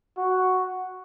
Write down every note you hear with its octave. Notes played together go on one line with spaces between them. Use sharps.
F#4